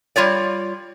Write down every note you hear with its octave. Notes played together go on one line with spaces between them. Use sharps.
G3 F4 C#5 D5